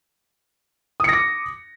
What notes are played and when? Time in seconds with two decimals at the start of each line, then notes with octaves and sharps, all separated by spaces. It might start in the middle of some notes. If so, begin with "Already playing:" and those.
1.00 D#6
1.04 C#7
1.09 A#6
1.13 D6